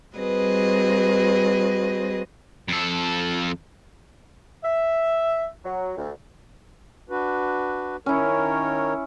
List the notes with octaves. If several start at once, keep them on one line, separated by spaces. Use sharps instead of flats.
G3 C4 F#4 G#4 B4 D#5
F2 A4
E5
F#3
D2
D4 F#4 B4
D#3 C#4 E4 A#4 C#5